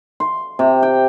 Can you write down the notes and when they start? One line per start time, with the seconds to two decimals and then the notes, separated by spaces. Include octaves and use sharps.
0.20 C6
0.59 C3
0.83 G5